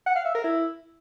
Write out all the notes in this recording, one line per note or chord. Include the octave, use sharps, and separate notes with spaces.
F#5
F5
E5
A#4
E4